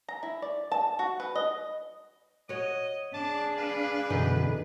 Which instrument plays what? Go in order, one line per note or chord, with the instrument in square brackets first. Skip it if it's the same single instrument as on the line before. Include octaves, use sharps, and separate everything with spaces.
[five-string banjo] A#5
E4
D5
A5
F#4
B4
D#5
[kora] F#4 C#5 [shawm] D#5
[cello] D4 G#4 [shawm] A5 [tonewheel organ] D6
[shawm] B4 [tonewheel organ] F5
[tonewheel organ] F#2 B2 D3 [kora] E3 B3 D#4